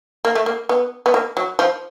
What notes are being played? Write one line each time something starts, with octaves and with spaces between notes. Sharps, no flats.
A#3
A3
A#3
B3
B3
A#3
F#3
F3